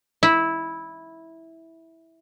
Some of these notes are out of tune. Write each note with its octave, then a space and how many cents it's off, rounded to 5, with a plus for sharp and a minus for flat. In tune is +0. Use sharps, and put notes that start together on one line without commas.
E4 -10